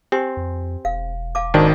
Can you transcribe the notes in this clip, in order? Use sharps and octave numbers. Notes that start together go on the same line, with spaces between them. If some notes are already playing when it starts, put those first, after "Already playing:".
C4 G4 G#5 C6
F2
E1 F5
F5 A5 D6
G#1 D#3 D4 F#4 C5 G5